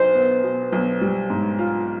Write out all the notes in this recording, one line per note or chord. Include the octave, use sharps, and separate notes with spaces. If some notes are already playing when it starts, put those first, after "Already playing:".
Already playing: B1 B2 D#4 C5
B3
B2
B1
G3
G#2
F4